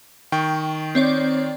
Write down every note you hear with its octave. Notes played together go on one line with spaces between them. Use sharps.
D#3 G5 C#6
C4 C#5 D5